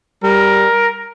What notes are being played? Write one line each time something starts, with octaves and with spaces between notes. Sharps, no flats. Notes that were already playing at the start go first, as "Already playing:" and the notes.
G3 A#4